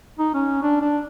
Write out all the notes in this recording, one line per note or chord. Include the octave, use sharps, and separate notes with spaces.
D#4
C#4
D4
D4